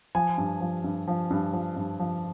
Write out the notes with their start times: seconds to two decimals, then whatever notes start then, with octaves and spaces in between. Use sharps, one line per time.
0.15 F3 G#5
0.38 G2
0.61 F3
0.84 G2
1.07 F3
1.31 G2
1.53 F3
1.76 G2
2.00 F3